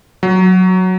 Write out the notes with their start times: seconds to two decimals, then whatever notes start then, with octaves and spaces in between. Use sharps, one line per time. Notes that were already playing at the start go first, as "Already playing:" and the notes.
0.23 F#3